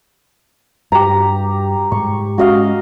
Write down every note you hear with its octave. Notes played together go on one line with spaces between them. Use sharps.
G2 G4 A#5
G#2 C#6
G#3 C#4 F#4 D#5 F5